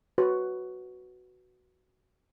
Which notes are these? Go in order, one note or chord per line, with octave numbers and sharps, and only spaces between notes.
F#4 B4 C#5